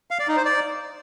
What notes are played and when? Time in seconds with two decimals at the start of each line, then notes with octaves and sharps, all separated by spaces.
0.11 F5
0.19 D5
0.28 D#4
0.37 C5
0.45 D5